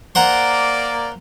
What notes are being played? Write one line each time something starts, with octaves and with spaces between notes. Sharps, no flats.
A#3 C5 D5 F#5 A#5